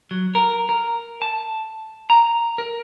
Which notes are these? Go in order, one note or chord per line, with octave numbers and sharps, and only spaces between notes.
F#3
A#4
A#4
A5
A#5
A#4